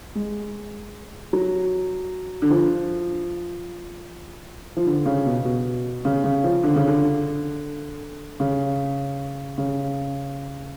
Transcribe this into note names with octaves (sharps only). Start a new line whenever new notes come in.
G#3
F#3
D3
F3
F3
D3
C#3
B2
B2
C#3
C#3
F3
D3
C#3
D3
C#3
C#3